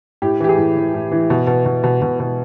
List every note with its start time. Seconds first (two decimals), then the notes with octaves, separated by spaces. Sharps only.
0.22 A2 G4
0.40 E3 G4
0.49 G#4
0.58 A2
0.76 E3
0.94 A2
1.11 E3
1.30 B2
1.47 B2
1.65 B2
1.84 B2
2.02 B2
2.20 B2